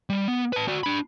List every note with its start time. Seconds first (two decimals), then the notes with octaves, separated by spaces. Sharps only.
0.10 G3
0.28 B3
0.53 B4 A5
0.68 F#4 D5
0.83 D4 B5